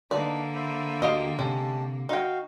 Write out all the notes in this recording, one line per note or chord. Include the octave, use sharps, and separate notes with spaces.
D3 A#3 D4 D#4 B4 D5
C5 E5 B5
D2 G4 D#5 F5 C6
C3 G#3 C#4 G4 A5
D#4 F#4 F5 G5